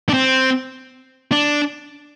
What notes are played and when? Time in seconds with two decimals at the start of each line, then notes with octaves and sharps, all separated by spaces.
0.09 D4
0.13 C4
1.32 D4